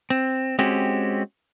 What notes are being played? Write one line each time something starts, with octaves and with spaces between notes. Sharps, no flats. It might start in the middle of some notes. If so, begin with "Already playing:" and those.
C4
G#3 C4 C#4 F#4 G4